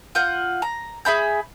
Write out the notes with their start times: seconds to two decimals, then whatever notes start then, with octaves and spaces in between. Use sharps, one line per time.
0.15 F4 F#5 G6
0.62 A#5
1.05 G#4 E5 B5 G6